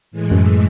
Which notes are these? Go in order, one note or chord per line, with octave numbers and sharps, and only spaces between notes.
A2 E3 G#3
F#2